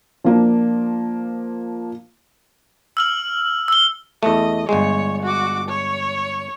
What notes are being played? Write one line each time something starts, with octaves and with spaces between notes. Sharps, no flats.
F3 A#3 D4
E6 F6 F#7
E6 G7
E2 A3 D#5
G1 G#3 C#5
F#4 D6
C#5